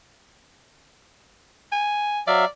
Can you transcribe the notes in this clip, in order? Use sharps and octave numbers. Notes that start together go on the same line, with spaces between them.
G#5
F#3 D5 E5 F5